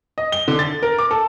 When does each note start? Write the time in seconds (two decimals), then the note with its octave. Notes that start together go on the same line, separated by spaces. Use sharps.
0.18 D#5
0.32 G7
0.48 D3
0.59 A6
0.83 A#4
0.99 D6
1.11 A4